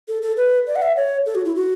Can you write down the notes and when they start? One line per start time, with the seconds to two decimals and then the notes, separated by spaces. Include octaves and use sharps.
0.08 A4
0.22 A4
0.37 B4
0.67 D5
0.76 F#5
0.82 E5
0.96 C#5
1.26 A4
1.35 F#4
1.45 E4
1.56 F#4